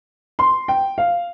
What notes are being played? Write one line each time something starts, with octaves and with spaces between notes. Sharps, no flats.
C6
G5
F5